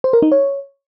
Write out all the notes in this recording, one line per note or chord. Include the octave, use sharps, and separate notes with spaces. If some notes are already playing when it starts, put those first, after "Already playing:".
C5
A#4
D#4
C#5